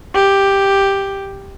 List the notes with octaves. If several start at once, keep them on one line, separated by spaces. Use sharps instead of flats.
G4